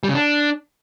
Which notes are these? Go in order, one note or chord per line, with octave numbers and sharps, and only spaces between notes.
G3
C#3
D4